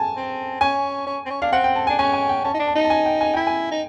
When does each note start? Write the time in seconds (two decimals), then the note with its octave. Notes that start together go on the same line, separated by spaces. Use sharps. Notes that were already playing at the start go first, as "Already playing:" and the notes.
Already playing: G#5 A5
0.17 C4
0.61 C#4 G#5
1.07 C#4
1.26 C4
1.30 C#4
1.42 D4 F5
1.52 C4 F#5
1.64 G5
1.76 A5
1.87 D4 G#5
1.98 C#4 G#5
2.13 G#5
2.29 G5
2.45 C#4 A5
2.54 D#4
2.59 D4
2.68 A5
2.75 D#4
2.85 A5
2.90 G#5
3.06 G5
3.21 G#5
3.34 E4 G5
3.47 G#5
3.71 D#4